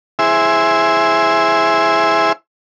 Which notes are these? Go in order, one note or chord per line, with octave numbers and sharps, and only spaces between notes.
E4 G#4 C5 E5